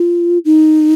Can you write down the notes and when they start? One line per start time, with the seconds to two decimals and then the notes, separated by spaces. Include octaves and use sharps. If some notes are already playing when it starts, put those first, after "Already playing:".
Already playing: F4
0.45 D#4